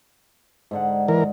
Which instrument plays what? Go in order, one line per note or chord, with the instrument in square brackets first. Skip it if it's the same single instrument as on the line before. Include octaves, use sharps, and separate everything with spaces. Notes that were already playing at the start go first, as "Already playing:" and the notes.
[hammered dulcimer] G#2 D3 F#5
[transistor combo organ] E3 A#4